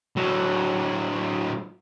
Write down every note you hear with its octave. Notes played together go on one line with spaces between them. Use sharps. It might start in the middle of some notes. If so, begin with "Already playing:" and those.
A2 F#3